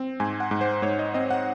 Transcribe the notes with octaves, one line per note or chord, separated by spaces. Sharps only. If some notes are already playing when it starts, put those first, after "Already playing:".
Already playing: C4
G#2 G#5
F#5
G#2
C5
G#2 C#5
D#5
C4 D#5
F#5